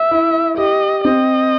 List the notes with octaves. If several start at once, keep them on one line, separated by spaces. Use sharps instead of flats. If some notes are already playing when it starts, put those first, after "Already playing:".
Already playing: E5
E4
G4 D#5
C4 D#5